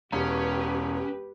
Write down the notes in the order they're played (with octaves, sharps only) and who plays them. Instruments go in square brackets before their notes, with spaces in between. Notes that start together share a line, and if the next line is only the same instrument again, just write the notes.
[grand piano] E1 [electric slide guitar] C#4 [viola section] G4 B4